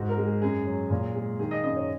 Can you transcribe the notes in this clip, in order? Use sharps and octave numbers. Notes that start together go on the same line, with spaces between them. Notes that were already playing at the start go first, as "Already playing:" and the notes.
Already playing: G#2 F#4
A#4
G#3
G#4
F#2 G#4
F#3
A#2
G#3
D#3 G#4
D#5
F#2 D#5
C#5